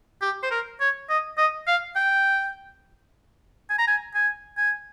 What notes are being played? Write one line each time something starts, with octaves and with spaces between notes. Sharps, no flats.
G4
C5
A#4
C#5
D#5
D#5
F5
G5
G#5
A#5
G#5
G#5
G#5